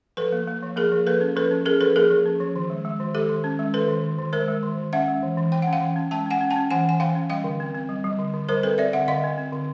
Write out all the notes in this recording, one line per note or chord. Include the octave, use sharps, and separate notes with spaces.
F3 A4 B4
A#3
A#3
F3
A#3 G#4 A#4
F3
A#3 A4 B4
C#4
F3 A4 B4
C#4
C#4 G#4 A#4
F3 A4 B4
A#3 G#4 A#4
F3
C#4
F3
D#3
G#3
G#3
D#3
G#3 G4 A4
D#3
C#4
G#3
D#3 A4 B4
D#3
D#3
D#3
G#3 A#4 C5
G#3
D#3
D#3
C#4 E5 F#5
G#3
E3
E3
E3 G5
C#4 F#5
F5 G5
E3
C#4
G#3 G5 A5
C#4 F#5 G#5
C#4
G5 A5
C#4
E3 F#5 G#5
E3 G#5
E3 F5 G5
C#4
G3 F5 G5
D3
C4
C4
G3
G3
D3
D3
G3 A#4 C5
C4 A4 B4
C4 D5 E5
D3 E5 F#5
D3 D#5 F5
C4
C4
D3